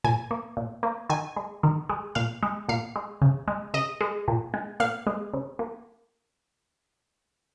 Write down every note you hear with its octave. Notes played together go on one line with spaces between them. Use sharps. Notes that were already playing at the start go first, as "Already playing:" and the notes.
A#2 G#5
A#3
A#2
A#3
D#3 G#5
G#3
D#3
G#3
A#2 F5
G#3
A#2 F5
G#3
C#3
G#3
C#3 D#5
G#3
A#2
G#3
A#2 F5
G#3
C#3
A#3